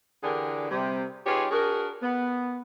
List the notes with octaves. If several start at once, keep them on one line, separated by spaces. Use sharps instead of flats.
D3 E3 D4 G4 G#4 A#4
C3 G3
D#4 F4 G4 G#4 B4 C#5
D4 F#4 G#4 A#4
B3